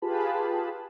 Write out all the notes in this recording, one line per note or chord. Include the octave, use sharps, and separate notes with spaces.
F4 G4 G#4 B4 A5 B5